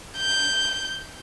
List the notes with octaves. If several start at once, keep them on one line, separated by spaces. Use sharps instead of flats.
G6